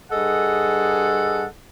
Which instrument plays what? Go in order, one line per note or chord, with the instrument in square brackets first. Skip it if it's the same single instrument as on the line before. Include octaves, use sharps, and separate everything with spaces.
[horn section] G2 G#4 A4 D#5 F#5